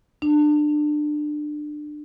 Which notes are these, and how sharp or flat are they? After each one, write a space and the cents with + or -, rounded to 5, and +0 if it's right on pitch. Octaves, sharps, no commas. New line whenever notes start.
D4 +25